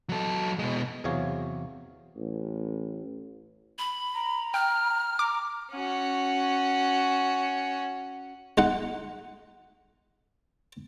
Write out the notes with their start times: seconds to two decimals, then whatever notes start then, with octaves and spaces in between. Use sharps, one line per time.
0.09 F#3 A4
0.59 B2 G#3
1.04 E2 C3 F#3 G#4 C#5 F5
2.16 A1
3.79 B5
4.14 A#5
4.54 G5 F6
5.19 A#5 D6
5.72 C#4 F#4
8.58 G#3 D#4 F#5